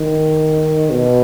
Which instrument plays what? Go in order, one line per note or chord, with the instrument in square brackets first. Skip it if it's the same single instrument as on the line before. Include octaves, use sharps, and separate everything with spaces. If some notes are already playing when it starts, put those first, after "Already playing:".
Already playing: [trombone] D#3
B2